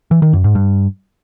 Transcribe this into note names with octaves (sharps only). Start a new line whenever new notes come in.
E3
D#3
F#2
G#2
G2